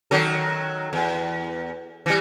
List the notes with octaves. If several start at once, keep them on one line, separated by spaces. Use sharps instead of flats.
D#3 F#3 A4
E2
E3 G3